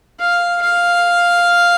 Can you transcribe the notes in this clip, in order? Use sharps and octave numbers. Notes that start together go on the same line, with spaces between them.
F5
F5